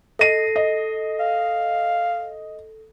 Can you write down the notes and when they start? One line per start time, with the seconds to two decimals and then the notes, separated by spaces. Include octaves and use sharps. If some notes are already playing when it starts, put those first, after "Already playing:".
0.19 A4 D#5 A#6 C7 D#7
0.56 D#5
1.20 F5